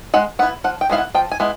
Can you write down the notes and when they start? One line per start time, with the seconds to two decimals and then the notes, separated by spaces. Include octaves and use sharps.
0.14 G#3 F#5
0.39 B3 F#5
0.43 E4
0.64 F3 F#5
0.81 G5
0.90 G#3 B3 E4 F5
0.98 F#5
1.14 F3 G5
1.32 G#5
1.40 G#3 B3 E4